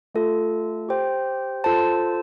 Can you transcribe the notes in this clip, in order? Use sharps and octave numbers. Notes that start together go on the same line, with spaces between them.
A3 F4 A4
G4 C5 G5
F4 A4 C5 A5